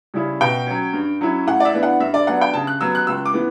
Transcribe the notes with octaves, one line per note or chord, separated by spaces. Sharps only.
C#3 G3 C#4 E4
B2 G5
F#3 C#4
G2
F#3 C#4 E4
A2 F#5
D5
E5
E3 B3 D4
F#5
G2 E5
D5
F#3 B3 D4 F#5
G5
C#3 A5
F#6
F#3 B3 E6
F#6
C#2 E6
D6
E3 B3